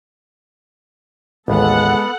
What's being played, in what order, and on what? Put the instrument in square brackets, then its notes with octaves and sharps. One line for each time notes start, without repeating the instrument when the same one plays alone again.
[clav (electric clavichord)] A1 D#2 [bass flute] G#3 [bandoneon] B3 [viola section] A4 F#5